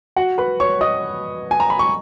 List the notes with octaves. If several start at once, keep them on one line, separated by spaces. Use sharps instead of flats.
F#4 F#5
B4 B5
C#5 C#6
D#5 D#6
G#5
A#5
B5
C#6